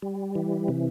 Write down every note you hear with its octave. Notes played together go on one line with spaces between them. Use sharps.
G3
E3
C3